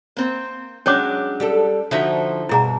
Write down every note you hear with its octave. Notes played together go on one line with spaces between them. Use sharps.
A#3 C4
F#3 G#3 C#4 D4 C#5 D6
G3 G4 A4
D3 F3 D#4 F#4 E5
G2 B2 E4 G#4 A#5